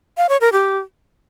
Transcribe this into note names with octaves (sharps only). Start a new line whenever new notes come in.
F5
C#5
A#4
G4